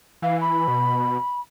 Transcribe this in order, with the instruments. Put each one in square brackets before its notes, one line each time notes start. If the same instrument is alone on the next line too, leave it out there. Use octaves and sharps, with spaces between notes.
[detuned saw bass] E3 [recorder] F5
[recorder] B5
[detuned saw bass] B2